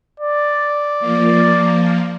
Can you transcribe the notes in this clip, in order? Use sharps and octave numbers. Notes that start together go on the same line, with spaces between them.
D5
F3 A#3